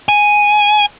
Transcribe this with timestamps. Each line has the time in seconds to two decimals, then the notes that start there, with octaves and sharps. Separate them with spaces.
0.09 G#5